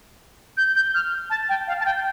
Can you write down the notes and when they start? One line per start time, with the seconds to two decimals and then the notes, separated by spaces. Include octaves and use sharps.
0.57 G6
0.75 G6
0.94 F6
1.30 A5
1.49 G5
1.68 F5
1.80 A5
1.85 G5